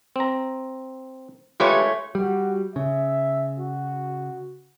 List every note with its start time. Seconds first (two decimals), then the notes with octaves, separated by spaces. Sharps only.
0.16 C4 A#5
1.60 G#3 A3 F4 G4 B4 C#5
2.15 G3 F#4
2.76 C#3 E5
3.60 F#4